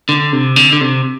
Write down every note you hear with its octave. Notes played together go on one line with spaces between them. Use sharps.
D3
C3
D3
D3
C3